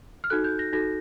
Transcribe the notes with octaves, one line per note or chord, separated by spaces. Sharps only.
F6
D#4 F#4 A4 F#6
G6
A#6
D#4 F#4 A4 A#6